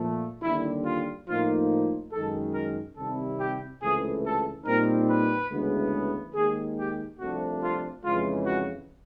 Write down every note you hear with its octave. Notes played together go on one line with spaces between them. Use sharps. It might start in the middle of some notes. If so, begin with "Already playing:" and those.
Already playing: A#2 F3 A3
D#2 D3 G3 E4
F4
A2 F3 A#3 D#4 F4
F#2 D#3 G#3 A4
A#4
C3 D#3 G3 C4 E4 A4
G4
C#2 C3 E3 A3 G#4
A4
A#2 G3 C4 D#4 A#4
B4
D2 C#3 E3 G#3 B3
D#2 D#3 G#3 G#4
G4
C2 C3 F3 A3 D4 F#4
F4
F2 C#3 E3 G#3 F4
F#4